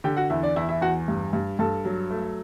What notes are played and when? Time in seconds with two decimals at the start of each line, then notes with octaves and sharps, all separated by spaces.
0.04 D3 G4 G5
0.17 F#4 F#5
0.30 E2 E4 E5
0.43 D4 D5
0.56 E2 E4 E5
0.69 E4 E5
0.81 E2 F#4 F#5
1.08 G2
1.33 G2
1.59 G2 A4 A5
1.85 F#3
2.10 A3